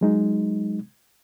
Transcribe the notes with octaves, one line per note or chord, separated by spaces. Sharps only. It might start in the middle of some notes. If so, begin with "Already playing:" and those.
F#3 G#3 D#4